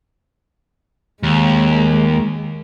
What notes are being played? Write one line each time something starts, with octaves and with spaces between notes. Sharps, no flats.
D#2 G#3